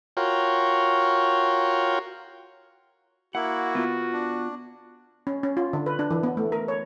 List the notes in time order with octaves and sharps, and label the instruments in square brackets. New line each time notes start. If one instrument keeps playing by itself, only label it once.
[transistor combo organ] F4 F#4 A#4 C#5 G5
[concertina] A#3 E4 [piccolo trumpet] F#4 [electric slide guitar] F#5
[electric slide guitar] B3 F4
[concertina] D4
[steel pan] C#4
C#4
F4
D3
B4
D4
E3
B3
A3
A#4
C#5